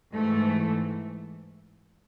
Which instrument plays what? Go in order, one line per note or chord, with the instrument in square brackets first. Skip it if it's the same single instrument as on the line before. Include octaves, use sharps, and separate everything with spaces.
[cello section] G#2 E3 A3